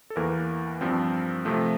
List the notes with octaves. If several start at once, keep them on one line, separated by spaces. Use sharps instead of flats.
A4
E2 E3 A#3 A#4
G2 F3 C4
C3 F3 A3